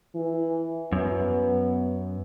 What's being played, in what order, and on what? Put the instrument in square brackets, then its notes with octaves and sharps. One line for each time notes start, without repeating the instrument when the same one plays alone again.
[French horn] E3
[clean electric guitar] F#2 [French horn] B3